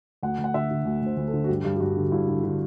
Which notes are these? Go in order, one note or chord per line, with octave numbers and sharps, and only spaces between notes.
D2 F#5
D2
F#5
D3 E5
D3
D2
D2 C5
D2
A4
D3
F#4
G2 G4
G2
G4
G2 F#4
D3
G2 E4
D3
D3